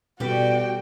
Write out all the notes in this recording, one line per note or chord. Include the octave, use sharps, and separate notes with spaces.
B2 G3 B3 F#4 G4 A4 G5